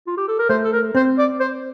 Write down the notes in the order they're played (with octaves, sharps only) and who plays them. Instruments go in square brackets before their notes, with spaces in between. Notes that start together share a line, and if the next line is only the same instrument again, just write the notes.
[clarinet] F4
G4
A4
A#4
[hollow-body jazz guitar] A3 [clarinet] C5
[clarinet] A4
A#4
[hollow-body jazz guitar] C4 [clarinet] C5
[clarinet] D5
C5